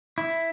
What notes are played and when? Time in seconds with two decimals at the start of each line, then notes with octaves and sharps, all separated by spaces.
0.18 E4